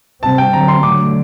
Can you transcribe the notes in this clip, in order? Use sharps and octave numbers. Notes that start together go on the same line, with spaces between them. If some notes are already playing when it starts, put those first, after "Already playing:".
C3 G3 C4 A5
G5
D3 F#3 C4 A#5
C6
D3 F#3 A3 D6